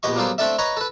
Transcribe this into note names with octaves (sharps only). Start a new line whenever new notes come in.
A#1 B3 G4 D#5 C#6
F#3 G3 A#3 B3 A4 C5
A3 C4 D4 A4 D5 E5
B4 C#5 D#5 A#5 C#6
A4 B4